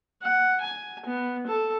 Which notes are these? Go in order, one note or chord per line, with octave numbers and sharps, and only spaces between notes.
F#5
G#5
B3
A4